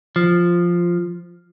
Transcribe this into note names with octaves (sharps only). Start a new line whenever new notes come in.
F3